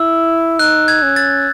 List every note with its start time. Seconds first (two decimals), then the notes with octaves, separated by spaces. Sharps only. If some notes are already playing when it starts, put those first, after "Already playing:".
Already playing: E4 E6
0.59 D#4 F#6
0.88 G#6
1.03 C#4
1.16 A6